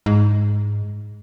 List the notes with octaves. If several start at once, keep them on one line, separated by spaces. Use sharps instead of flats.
G#2